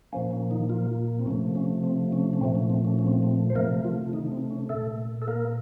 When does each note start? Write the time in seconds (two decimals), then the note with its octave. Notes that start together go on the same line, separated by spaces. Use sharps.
0.13 A#2 F3 A#3 C#4
0.31 C#4
0.50 D#3 D#4
0.70 F3 F4
1.19 C4
1.26 C3 F3 A3 C#4
1.55 C#4
1.84 C4
2.13 C#4
2.33 C#4
2.41 A#2 F3 A3 C4
2.55 C#4
2.70 C4
2.85 C#4
2.99 C#4
3.07 C4
3.23 C4
3.50 C5
3.55 C3 F3 A3 A#3 A#4
3.85 F3 F4
4.13 D#3 D#4
4.32 C4
4.50 C#4
4.69 A#2 A3 A4
5.22 A4
5.28 A#3 A#4